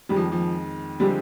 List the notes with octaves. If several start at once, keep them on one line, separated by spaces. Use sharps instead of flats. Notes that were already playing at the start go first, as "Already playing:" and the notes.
F2 D#3 G3 G#3
F3
F3
D3 F3 G3 G#3 C4 G4